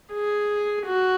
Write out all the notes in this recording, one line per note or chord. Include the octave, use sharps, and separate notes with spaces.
G#4
F#4